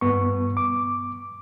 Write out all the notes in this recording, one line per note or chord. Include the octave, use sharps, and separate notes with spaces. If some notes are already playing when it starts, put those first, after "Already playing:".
G2 B3 C#6
D6